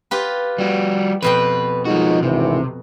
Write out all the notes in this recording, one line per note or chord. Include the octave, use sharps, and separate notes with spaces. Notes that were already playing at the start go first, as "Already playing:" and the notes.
F4 G4 B4
G3 F#4
F2 B2 B4 G5
F3 G#3 A#3 D#4 F#4
G#1 D2 C3 E3